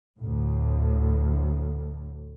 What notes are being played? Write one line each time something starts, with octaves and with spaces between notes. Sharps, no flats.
D2 A2